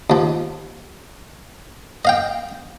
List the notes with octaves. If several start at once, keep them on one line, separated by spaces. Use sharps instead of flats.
D#2 F3
D#5 F5 G5